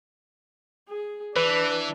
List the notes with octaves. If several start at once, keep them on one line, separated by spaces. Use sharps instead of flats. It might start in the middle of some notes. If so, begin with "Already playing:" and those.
G#4
E3 D4 B4